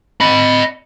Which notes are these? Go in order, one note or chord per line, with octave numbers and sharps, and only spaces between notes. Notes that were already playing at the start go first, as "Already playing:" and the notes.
D#5 B5